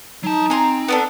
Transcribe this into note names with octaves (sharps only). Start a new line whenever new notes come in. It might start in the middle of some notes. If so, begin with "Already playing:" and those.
F#3 D#4 A5
C4 G#5 A#5 C6
B3 D4 A4